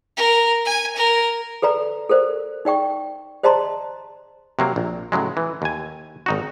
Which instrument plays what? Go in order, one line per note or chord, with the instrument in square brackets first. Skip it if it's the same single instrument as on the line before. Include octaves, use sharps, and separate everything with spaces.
[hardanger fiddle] A#4
G#5
A#4
[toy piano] A4 B4 D5 A#5
A4 A#4 C5 D5
D#4 D5 G5 C#6
C5 D5 D#5 A5 A#5 C6
[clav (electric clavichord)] C3 F#3 A#3
A#1
A2 C#3 F#3 G#3
E3
D#2 G#5
G#1 D#4 F#4